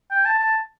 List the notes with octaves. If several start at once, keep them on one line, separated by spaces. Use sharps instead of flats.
G5
A5
A5